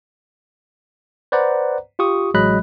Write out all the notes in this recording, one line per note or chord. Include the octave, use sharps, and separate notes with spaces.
B4 C5 D5 F#5 A#5
F4 G4 C#6 D#6
A1 F#3 G#3 D#5 B5 F#6